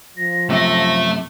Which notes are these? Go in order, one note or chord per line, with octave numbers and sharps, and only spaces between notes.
F3 A#6
F#2 C3 A3 E5